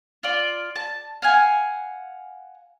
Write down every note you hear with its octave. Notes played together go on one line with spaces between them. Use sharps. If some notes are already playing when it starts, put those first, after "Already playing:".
F4 D5
A5
F5 F#5 G#5